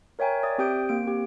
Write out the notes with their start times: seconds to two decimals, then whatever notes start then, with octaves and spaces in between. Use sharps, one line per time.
0.19 A#4 C#5 E5 G5 G#5 A#5
0.43 D5 E5 D#6
0.58 C4 G4 G5 D#6 G6 D7
0.89 A#3 D7
1.03 C4 G4